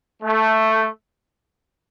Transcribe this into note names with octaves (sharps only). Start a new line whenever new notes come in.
A3